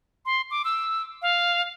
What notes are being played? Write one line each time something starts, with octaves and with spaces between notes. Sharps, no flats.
C6
D6
E6
F5